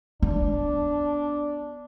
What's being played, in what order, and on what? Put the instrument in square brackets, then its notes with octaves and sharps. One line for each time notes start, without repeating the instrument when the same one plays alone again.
[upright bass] B3 [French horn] D4